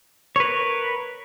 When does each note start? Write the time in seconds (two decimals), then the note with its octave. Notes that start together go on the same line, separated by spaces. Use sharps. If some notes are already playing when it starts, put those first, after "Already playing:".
0.36 C#5
0.40 B4
0.44 A#4